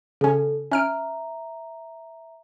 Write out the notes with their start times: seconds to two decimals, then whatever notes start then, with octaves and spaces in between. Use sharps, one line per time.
0.21 C#3 C#4 A4
0.71 C#4 E5 A#5 F6 D7